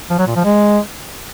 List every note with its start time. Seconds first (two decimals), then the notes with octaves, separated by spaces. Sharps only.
0.10 F3
0.18 F#3
0.27 A#2
0.36 F3
0.44 G#3